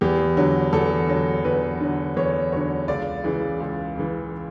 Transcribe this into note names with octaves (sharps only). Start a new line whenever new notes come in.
E2 G4
D3 F#3
E2 A4
D3 F#3
E2 B4
D3 F#3
E2 C#5
D3 F#3 C#5
C#2 D5
C#3 E3
C#2
C#3 E3